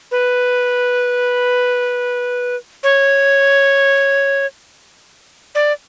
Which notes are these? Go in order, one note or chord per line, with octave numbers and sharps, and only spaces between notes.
B4
C#5
D5